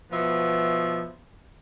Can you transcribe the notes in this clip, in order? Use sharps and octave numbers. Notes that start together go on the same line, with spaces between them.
B2 F3 B3 E5